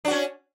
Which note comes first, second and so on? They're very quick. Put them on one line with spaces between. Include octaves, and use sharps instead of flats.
D4 F#4 C#4